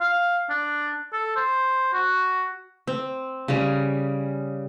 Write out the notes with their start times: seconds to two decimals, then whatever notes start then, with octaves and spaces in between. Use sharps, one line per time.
0.01 F5
0.50 D4
1.13 A4
1.36 C5
1.93 F#4
2.87 C4
3.48 C#3 G3